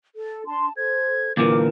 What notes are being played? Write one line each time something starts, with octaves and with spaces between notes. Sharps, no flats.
A4
D4 A5 C6
A4 C5 G#6
D2 A#2 E3 A#4 D6